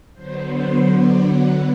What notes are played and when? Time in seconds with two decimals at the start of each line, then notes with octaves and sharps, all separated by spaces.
0.14 D3 F#3 B3 C5
0.52 C5
0.89 D3 F#3 B3 D5
1.26 F#5